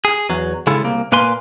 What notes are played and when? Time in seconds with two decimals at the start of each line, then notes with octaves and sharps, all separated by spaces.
0.05 G#4
0.29 E2 F#3
0.67 C#3 G#3 E4 A4
0.83 C2 A#3
1.12 A#2 A#3 B4 G#5 C6